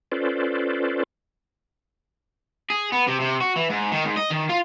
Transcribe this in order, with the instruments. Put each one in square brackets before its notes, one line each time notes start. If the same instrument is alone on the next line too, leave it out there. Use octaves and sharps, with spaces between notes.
[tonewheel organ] C#4 F4 A4 B4 C5 D5
[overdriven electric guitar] G#4
B3
C3
C3
F#4
E3
G#2
D#3
G#2
D#5
D#3
F4